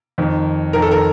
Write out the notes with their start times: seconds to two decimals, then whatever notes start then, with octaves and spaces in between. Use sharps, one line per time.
0.18 F2 D#3
0.73 F2 D#3 A#4
0.82 A4
0.91 A#4